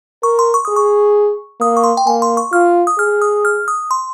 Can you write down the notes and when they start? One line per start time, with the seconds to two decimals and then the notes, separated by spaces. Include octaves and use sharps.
0.23 A#4 C#6
0.39 C6
0.54 C#6
0.65 G#4 D#6
0.76 C#6
1.60 A#3 D#6
1.77 C#6
1.84 C6
1.97 G5
2.07 A#3 G#5
2.22 C6
2.37 C#6
2.53 F4 F6
2.87 D#6
2.98 G#4 F6
3.22 D#6
3.45 F6
3.68 D#6
3.91 C6